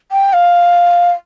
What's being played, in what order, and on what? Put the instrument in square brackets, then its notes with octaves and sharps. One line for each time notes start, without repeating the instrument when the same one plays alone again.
[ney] G5
F5